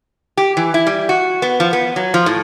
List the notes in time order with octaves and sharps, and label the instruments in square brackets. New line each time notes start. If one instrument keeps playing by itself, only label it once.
[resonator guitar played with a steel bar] G4
E3
E4
G3
F#4
B3
F3
B3
F#3
F3
A2